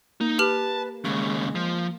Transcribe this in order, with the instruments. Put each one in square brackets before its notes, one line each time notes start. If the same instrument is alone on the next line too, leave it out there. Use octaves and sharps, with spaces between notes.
[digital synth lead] A#3 [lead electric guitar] D#4
[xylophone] G4 F6 F#7 [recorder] B4 [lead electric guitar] A5
[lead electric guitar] D#2 C#3 [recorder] G#3
[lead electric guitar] F3